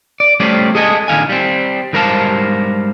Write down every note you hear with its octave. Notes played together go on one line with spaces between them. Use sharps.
D5
G3 A3 C#4 G4 C5 D5
G#4 A4 D#5 E5 G#5
A#2 D3 D#3 F5 G#5
G3 C4
G#2 G3 A#4 C5 F5 A5